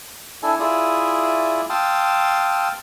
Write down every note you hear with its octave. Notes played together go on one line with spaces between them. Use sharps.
D4 E4 A4 G#5
E4 F4 G#4 D5 E5 D#6
F5 G5 A5 C6 D#6 E6